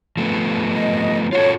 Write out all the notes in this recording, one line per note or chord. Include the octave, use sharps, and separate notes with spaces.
F3 A3 B3
D#5
F4 F#4 A4 C#5